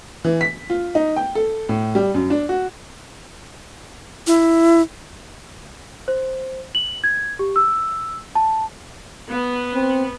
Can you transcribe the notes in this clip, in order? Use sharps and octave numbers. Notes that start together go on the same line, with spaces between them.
E3
B6
F4
D#4
G5
A4
A2
G3
F#2
D4
F#4
E4
C5
F#7
G#6
G4
E6
A5
B3
C4